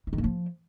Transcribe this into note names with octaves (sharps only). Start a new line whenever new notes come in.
E3
D#3
A#3
F3